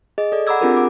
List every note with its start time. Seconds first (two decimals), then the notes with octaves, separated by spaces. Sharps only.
0.18 G#4 D#5
0.32 A4 D5
0.47 F#5 A#5 B5 D6 E6 G#6
0.61 C4 D4 F4 G4 G#4 A#4
0.75 F#5 D6